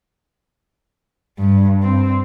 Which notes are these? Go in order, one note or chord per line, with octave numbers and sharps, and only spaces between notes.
G2
C4